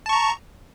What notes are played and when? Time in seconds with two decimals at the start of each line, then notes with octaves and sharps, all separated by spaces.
0.06 A5
0.09 C#6
0.13 A#5